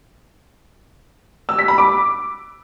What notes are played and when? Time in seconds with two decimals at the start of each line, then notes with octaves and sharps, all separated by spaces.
1.49 E6
1.58 B6
1.68 B5
1.78 D6